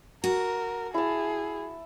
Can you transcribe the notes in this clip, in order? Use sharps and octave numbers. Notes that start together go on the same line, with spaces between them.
F#4 A#4
E4 G#4 A5